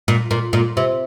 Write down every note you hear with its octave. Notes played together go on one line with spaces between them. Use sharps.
A#2
A#2
A#2
C3